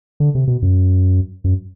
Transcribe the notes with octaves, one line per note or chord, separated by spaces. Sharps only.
D3
C3
B2
F#2
F#2